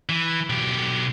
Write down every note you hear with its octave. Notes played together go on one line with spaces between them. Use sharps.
E3
B1 G4